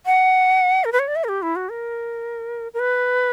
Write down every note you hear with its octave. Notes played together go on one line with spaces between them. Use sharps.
F#5
A#4
B4
C#5
D5
E5
A#4
G4
E4
F#4
A#4
A#4
B4